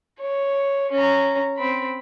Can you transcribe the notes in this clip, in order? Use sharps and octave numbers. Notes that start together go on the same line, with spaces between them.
C#5
C#4 A#5
C4 B5